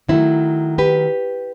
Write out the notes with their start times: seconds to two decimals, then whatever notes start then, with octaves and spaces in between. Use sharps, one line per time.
0.09 D#3 F#3 A3 C4 E4
0.78 G4 B4